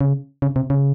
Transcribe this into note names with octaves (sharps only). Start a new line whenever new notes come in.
C#3
C#3
C3
C#3